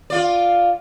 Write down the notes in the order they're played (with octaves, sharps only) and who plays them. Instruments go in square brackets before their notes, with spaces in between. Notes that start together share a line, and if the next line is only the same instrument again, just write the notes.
[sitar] F4 D5